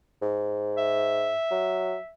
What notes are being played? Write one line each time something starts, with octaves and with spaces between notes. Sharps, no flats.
G#2
E5
F#3